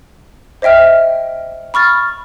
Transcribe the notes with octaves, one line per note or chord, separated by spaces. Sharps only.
C5 D#5 E5 G5 F6
B5 C#6 F6 A6